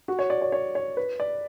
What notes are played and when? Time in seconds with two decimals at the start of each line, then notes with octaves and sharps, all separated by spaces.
0.08 F#4
0.19 C#5
0.30 D5
0.42 C#5
0.52 C#5
0.75 C#5
0.97 B4
1.20 D5